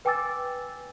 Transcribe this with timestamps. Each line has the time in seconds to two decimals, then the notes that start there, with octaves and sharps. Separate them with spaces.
0.05 B4 G5 G#5 D6 E6 A6